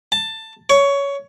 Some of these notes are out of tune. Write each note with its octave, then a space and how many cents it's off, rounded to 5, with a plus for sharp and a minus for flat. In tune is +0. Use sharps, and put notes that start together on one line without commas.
A5 +15
C#5 +15